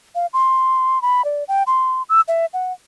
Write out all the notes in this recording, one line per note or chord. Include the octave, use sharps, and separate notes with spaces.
F5
C6
B5
D5
G5
C6
E6
E5
F#5